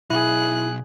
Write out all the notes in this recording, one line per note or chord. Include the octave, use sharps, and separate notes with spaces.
B1 E4 G#4 F#6